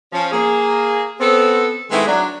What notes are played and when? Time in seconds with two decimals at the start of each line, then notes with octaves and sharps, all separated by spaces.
0.12 F3 C#4
0.31 A#3 G#4
1.19 B3 C4 A4
1.91 D#3 G#3 A3 B3 C4 E4
2.07 F#3 D4